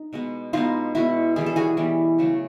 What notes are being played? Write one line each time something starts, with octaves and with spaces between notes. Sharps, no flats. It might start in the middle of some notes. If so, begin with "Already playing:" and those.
Already playing: D#4
B2 G#3 B3
B2 G#3 B3 D#4 F4
B2 G#3 B3 E4 F#4
E3 G3 B3 G#4
A4
F#4 G#4
E3 G3 B3
C#3 F#3 A3